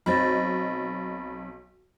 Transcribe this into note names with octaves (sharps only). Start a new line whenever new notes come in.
B1 C4 D#4 B5 A6 A#6